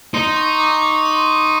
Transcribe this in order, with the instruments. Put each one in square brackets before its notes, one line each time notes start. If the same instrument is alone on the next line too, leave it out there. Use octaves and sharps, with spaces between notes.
[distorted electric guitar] D#4 [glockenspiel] C6
[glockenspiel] C#6
D6
C#6
D6
C6